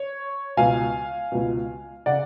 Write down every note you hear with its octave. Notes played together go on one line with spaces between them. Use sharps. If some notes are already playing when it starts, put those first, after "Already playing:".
Already playing: C#5
C#2 B2 F5 G#5
C#2 B2
C#3 D5 F#5